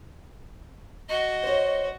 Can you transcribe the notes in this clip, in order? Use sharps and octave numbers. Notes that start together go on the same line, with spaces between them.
F#4 D#5
C5 C#5